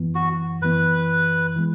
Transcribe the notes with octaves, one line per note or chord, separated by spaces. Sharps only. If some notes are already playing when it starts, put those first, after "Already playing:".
Already playing: F#2 E3 B3
F#4
F#2 E3 B3 B4
E3 G#3